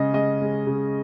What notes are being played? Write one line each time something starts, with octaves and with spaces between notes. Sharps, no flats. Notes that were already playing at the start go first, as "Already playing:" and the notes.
Already playing: C#3 G#3 C#4 D#5
G#3 D#5
G#3
C#3